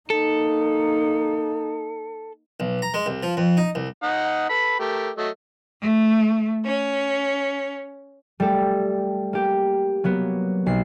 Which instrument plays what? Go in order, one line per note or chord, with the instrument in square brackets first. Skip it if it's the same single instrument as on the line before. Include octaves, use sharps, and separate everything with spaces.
[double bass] A#3 D#4 [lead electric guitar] A4
[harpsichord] B1
A#5
G#3
C2
F3
F2
D#4
C2
[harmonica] D#4 D#5 F#5
A4 B4 B5
A3 G4 A#4
F#3 A3 D#5
[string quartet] A3
C#4
[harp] G3 A3 A4
A#3 G4
F#3 A#3 B3
B1 C7